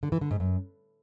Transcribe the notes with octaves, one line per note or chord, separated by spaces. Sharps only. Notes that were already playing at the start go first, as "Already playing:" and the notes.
D3
E3
D3
G#2
F#2